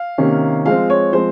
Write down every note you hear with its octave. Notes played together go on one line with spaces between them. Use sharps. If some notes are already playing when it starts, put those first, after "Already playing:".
Already playing: F5
C3 D#3 A#3 C#4
F3 G#3 C4 F5
C#5
F3 G#3 C4 C5